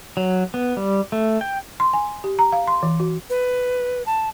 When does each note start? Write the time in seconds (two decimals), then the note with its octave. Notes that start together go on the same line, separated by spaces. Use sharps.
0.17 F#3
0.54 B3
0.77 G3
1.12 A3
1.41 G5
1.80 C6
1.93 G#5
2.24 G4
2.39 A#5
2.53 F5
2.68 C6
2.83 E3
3.00 F#4
3.30 B4
4.06 A5